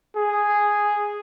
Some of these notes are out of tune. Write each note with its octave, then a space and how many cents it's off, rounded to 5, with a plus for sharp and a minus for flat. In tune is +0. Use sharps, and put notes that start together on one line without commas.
G#4 -5